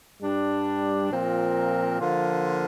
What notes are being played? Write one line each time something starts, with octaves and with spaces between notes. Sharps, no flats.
G2 G3 D4
A#2 F3 C4 A#4
D3 F3 A#3 F4